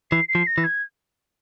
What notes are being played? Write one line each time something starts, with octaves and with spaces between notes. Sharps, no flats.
E3 C7
C7
F3
A#6
E3
G#6